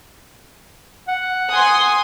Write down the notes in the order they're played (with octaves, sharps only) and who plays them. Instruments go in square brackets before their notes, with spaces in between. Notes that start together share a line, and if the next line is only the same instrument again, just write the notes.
[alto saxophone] F#5
[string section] G#5 C6 D#6